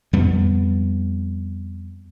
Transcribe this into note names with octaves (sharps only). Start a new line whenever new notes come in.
F2 G3 B3